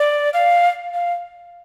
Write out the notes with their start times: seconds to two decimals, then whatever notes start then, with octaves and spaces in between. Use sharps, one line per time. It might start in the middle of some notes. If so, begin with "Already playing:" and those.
Already playing: D5
0.34 F5
0.94 F5